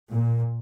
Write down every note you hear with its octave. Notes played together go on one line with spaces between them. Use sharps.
A#2